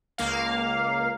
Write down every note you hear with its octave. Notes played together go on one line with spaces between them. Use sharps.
C#2 A#3 F5